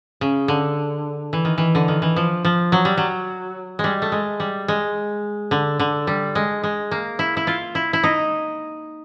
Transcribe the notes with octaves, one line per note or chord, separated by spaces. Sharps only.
C#3
D3
E3
D#3
E3
D3
D#3
E3
F3
F3
F#3
G3
F#3
G#3
G3
A3
G#3
G3
G#3
D3
D3
G3
G#3
G#3
A#3
E4
E4
F4
E4
E4
D#4